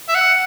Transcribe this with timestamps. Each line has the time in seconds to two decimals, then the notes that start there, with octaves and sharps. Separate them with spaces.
0.09 E5
0.15 F#5